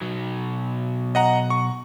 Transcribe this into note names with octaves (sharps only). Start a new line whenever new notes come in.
B2 F#3
D#5 F#5 A#5
C#6